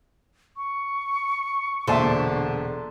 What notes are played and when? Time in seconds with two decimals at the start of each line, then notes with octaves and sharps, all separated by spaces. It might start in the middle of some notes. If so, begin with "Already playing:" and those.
0.57 C#6
1.87 E1 A#2 D3 C5 E5 A5 C6